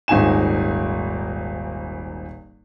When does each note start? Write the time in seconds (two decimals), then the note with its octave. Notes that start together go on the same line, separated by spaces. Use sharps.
0.08 D#1 G#1 D#4 G#5 E7